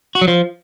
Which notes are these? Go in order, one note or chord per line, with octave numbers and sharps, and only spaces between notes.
F#4
F#3
F3